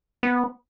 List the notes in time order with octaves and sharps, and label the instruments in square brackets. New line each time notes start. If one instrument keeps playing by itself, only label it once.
[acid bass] B3